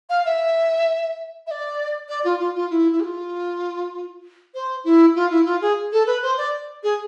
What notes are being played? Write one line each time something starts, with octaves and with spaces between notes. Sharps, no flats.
F5
E5
E5
D5
D5
F4
F4
F4
E4
E4
G#4
F4
C5
E4
F4
E4
F4
G#4
A4
B4
C5
D5
G#4